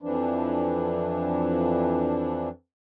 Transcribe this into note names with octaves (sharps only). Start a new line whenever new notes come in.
F2 E3 F3 D4